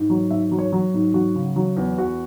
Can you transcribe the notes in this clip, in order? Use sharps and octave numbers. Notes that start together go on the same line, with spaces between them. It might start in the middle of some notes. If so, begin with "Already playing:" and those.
Already playing: G#2
F#3
G#2 E5
F#3
C#5
F#3
G#2
F#3 F#4
C#3
F#3
E2
E2 F#4